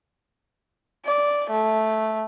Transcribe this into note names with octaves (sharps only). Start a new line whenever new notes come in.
D5
A3